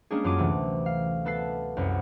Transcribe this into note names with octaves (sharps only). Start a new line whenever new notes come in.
G3 G#3 A#3 C#4 D4 G#4
F#2 F#3 F4 D6 D#7
D2 C3 E3 A3
F5
B3 A4 B4 A6 C7
C2 F#2